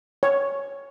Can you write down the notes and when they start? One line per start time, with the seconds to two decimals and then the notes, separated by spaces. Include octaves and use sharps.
0.23 C#5